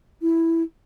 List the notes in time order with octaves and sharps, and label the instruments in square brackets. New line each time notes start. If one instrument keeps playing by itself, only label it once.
[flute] E4